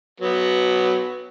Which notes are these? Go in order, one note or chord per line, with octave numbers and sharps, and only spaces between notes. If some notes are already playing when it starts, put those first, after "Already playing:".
F#3 B3